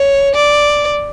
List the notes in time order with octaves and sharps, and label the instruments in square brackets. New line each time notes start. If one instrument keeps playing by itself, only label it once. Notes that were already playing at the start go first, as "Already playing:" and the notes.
Already playing: [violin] C#5
D5